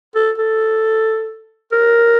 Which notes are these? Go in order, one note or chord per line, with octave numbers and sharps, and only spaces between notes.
A4
A4
A#4